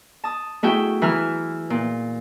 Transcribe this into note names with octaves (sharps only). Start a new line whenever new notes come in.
A5 D#6
A3 E4 F#4 G#4 E5 G5
E3 E4 B4 G#5 A#5 F6
A#2